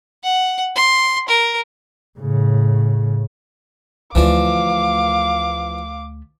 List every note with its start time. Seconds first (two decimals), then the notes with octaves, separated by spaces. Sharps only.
0.24 F#5
0.76 C6
1.28 A#4
2.19 A2 C#3
4.15 D2 E3 F3 A3 D5 F5 D6